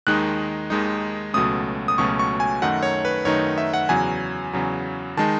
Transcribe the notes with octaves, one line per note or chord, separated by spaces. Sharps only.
D#2 D#3 G#3 D#4 F#6
D#2 D#3 G#3 D#4
C#2 B2 F#3 A3 C#4 D#6
D#6
C#2 B2 F#3 A3 C#4 C#6
C#6
G#5
F#2 D#3 A3 D#4 F#5
C#5
B4
F#2 D#3 A3 D#4 C#5
E5
F#5
E2 C#3 F#3 G#5
E2 C#3 F#3
D#3 G#3 D#4 A5